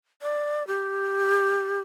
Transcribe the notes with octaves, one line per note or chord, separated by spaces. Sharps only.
D5
G4